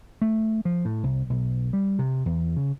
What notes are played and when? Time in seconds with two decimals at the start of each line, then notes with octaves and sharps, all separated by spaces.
0.21 A3
0.65 F3
0.85 A2
1.03 C2
1.30 B1
1.73 G3
1.99 C3
2.26 E2
2.57 C#3